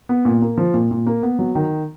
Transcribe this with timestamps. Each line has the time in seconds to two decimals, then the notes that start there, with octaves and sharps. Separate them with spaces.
0.09 B3
0.25 A#2
0.42 A#3
0.57 F3
0.74 A#2
0.91 A#2
1.07 A#3
1.23 B3
1.39 F#3
1.55 D#3